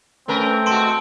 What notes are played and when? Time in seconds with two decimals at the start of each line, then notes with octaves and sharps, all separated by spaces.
0.28 A3 C4 C#4 A#4 B4
0.66 B2 G#3 F#4 A5 C6 D7